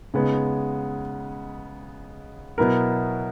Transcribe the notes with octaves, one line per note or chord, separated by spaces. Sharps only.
C#3 G#3 B3 D#4
B2 F#3 B3 E4 A#4